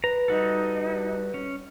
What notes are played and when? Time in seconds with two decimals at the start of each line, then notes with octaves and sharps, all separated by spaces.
0.04 B4 A#5
0.28 G3 D#4 F#4 A4
1.34 C#4